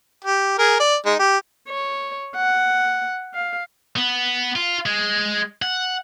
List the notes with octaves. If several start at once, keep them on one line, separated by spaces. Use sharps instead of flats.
G4
G#4 A#4
D5
G#3 D#4
G4
C#5
F#5
F5
B3
F4
G#3
F#5